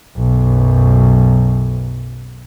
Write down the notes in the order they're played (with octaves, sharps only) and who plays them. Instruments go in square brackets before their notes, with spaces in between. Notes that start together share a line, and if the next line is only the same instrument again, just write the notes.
[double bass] B1 F#2